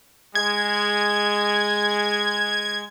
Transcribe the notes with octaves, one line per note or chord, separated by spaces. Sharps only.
G#3 G#6